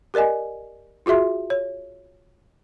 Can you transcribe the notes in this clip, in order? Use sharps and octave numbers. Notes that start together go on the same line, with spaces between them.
G4 A#4 D5 D#5 G#5
F4 F#4 G#4 E5 C6
C#5